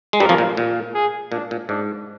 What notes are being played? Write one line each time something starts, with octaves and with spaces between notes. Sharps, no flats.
G#3
G2 G3 A#4
F2 F3
A#2
A#2
G#4
A#2 D4
A#2
G#2 D4